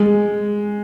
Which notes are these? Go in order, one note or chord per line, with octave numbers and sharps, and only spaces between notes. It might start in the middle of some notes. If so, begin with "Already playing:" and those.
Already playing: G#3